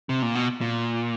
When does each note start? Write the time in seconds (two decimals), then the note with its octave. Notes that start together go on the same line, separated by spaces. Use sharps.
0.09 C3
0.22 A#2
0.35 B2
0.61 A#2